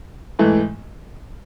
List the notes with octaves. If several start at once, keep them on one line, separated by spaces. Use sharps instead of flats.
G#2 E3 A3